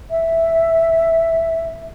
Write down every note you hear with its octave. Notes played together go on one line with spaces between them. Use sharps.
E5